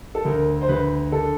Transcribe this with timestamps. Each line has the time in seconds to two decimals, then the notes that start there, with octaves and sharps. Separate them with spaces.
0.15 A4
0.25 D2 A#4
0.62 C5
0.69 D2 B4
1.12 D3 A4